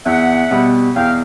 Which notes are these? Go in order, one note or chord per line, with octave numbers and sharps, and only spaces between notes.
E2 E5 F#5
B2 G3
E2 F5 G5